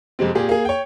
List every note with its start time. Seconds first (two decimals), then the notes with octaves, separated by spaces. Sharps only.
0.19 F2 C3 G#3 C4
0.35 A#2 G4 G#4
0.49 A#3 G#4
0.65 C#5 G5